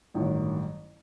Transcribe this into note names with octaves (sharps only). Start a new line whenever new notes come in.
A1 G2 D#3 F#3